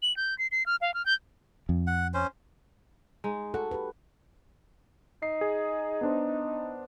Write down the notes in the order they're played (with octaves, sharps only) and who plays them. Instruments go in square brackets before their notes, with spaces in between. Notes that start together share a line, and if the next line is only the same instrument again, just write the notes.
[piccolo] F#7
G6
C7
C7
F6
F5
F6
G6
[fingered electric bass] F2
[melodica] F#5
C#4 C5
[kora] G#3 D#4
[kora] F#4 [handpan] A4
[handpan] G4 B4
[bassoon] D#4 [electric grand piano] C7
[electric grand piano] G#4
B3 D4 C5